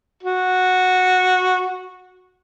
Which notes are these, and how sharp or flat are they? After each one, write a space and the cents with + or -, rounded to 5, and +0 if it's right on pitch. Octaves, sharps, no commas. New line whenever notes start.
F#4 -10